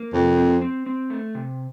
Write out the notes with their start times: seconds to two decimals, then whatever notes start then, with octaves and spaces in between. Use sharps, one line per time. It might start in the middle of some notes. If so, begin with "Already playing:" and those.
Already playing: A#3
0.13 F2 C3
0.37 C4
0.62 C4
0.86 C4
1.10 A3
1.35 C3